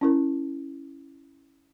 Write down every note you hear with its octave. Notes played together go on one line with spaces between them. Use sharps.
C#4 E4 A#4